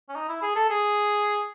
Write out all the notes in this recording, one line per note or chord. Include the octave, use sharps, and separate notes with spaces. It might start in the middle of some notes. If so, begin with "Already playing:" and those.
C#4
D#4
E4
G#4
A4
G#4